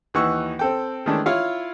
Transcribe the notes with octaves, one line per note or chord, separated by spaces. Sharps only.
D#2 E3 D#4 F#5 C#6 E6
C4 A4 G5
D#3 E3 G#3 A3 C#4 D4
E4 F4 C#5 F5